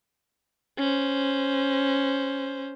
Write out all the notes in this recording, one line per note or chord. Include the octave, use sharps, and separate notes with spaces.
C#4 C5